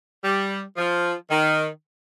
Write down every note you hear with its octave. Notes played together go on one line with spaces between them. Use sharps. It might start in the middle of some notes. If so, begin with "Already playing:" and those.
G3
F3
D#3